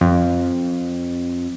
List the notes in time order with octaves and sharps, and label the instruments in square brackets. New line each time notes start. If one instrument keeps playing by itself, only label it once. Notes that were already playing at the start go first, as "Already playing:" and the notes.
[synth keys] F2